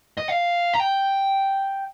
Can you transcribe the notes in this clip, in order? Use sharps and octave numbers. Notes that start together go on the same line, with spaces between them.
D#5
F5
A#5
G5